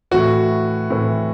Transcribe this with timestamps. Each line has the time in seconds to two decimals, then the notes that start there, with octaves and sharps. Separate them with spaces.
0.11 A2 E3 F#4
0.90 A2 E3